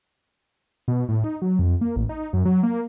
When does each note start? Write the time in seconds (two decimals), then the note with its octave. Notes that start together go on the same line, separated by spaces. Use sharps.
0.88 B2
1.09 A2
1.24 D#4
1.42 F#3
1.59 F2
1.81 A#3
1.96 A1
2.09 D#4
2.33 F#2
2.45 F#3
2.63 A#3